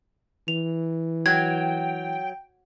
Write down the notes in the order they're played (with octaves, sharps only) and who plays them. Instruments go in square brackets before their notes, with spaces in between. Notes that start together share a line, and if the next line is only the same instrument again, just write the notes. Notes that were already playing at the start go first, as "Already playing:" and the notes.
[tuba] E3 [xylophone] F7
[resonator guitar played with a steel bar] F#3 [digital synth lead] G5 [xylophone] G#6